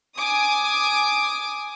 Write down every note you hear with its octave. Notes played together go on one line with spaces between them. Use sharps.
G#5 D6 D#6